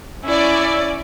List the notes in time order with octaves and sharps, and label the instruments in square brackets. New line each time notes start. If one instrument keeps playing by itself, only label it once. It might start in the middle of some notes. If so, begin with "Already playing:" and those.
[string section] C#4 D5 [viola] E4